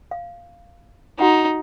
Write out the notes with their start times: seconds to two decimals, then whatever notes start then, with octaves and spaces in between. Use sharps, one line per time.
0.11 F5
1.19 D#4 F#4 F#5 A#5